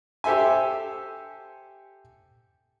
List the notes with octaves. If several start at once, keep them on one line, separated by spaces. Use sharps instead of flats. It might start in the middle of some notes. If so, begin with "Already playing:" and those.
G4 A4 C5 E5 G#5